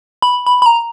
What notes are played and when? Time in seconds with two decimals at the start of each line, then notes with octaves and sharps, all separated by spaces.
0.22 B5
0.47 B5
0.62 B5
0.66 A#5